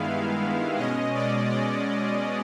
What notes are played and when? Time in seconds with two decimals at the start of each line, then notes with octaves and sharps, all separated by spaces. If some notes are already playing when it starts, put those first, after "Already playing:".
Already playing: G2 D#3 G#3 B3 E4 F5
0.77 B2 G#3 C#4 D#5
1.14 D5
1.50 D5